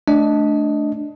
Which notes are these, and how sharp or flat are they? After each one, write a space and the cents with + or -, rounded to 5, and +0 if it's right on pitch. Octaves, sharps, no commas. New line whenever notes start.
A3 -20 D4 +0 D#5 +15